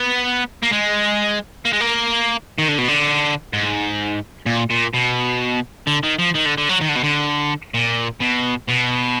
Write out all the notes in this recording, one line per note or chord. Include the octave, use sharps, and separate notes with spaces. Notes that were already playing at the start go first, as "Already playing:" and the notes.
Already playing: B3
A#3
G#3
A#3
G#3
A#3
D#3
D3
B2
D3
G#2
A#2
A#2
B2
D3
D#3
F3
D#3
D3
D3
F#3
D#3
D3
B2
D3
A#2
B2
B2